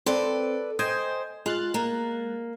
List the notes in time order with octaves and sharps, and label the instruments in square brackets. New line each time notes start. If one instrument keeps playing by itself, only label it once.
[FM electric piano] C4 [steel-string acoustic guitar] A4 B4 D5
[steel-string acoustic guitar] C5 [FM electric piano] D#5 G5 G#5
[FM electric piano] G#3 F#6 A6 [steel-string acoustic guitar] F4
[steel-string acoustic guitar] A#3